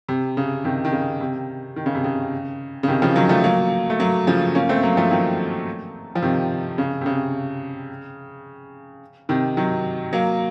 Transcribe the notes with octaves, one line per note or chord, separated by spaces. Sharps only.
C3
C#3
C3 D#3
D#3
C#3
C3
D#3
C#3
C3
C#3
C#3
C3 D#3
C#3 F3
D#3 F#3
F3 A3
F#3 A#3
A3
F#3 A#3
C#3 F3
A#3 C#4
A3 C4
F#3 A#3
F3 A3
D#3 F#3
F3
C3 D#3
C#3
C3
C#3
C3 D#3
D#3 F#3
F#3 A#3